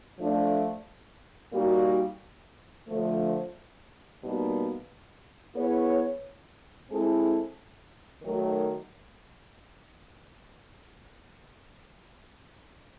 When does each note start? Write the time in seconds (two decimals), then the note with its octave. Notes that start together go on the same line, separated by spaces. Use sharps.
0.19 F3 A3 D4
1.52 A#2 G3 A#3 D#4 F#4
2.87 D3 F3 A3
4.21 B2 G3 A#3 D#4
5.55 B3 E4 G#4 C#5
6.89 G#3 C4 E4 A4
8.22 D#3 F#3 A3